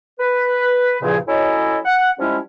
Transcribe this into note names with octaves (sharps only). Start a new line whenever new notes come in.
B4
E2 G2 A#2 C#3 F3 G#4
F#3 C#4 E4 A4 D#5
F#5
F3 G3 G#3 C#4 E4